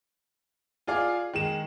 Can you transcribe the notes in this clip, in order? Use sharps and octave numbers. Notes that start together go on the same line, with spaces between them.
F4 G#4 D5 F5
D#3 G#3 E7